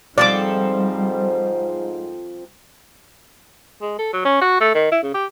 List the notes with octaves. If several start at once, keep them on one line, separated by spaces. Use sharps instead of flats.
G#2 F3 G3 C4 A4 C5 D5 D6
G#3
A4
F#3
C#4
F#4
A3
D#3
E4
C#3
G4